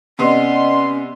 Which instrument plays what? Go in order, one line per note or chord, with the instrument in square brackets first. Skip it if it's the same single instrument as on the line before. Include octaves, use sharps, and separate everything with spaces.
[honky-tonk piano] C3 B3 [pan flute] C#4 [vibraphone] D5 D#5 F#5 [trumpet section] C6